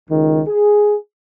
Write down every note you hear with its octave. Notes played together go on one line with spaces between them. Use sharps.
C#2 D#3
G#4